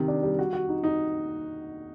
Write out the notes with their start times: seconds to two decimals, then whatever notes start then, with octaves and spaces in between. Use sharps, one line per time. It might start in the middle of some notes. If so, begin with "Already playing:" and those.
Already playing: C3 D#3
0.08 D4
0.23 G3
0.39 F#4
0.53 F#4
0.69 D#4
0.84 D#4